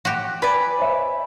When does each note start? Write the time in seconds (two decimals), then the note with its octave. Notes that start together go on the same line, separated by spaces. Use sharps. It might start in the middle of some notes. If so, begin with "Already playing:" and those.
0.05 F#4 G4
0.42 B4 D5 G#5 B5 B6
0.79 C5 C#5 E5